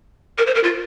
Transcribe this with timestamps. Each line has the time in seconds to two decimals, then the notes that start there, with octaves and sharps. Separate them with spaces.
0.38 A#4
0.47 C5
0.55 A#4
0.64 F4